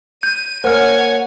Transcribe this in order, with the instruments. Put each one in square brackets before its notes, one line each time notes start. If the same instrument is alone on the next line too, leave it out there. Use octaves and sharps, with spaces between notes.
[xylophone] G6 [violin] D#7
[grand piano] A#3 [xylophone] C5 F6 [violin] C#5 G#5 [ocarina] F#5